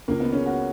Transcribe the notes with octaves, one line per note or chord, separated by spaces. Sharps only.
C#2 A#3
B3
C#3 C#4
F#4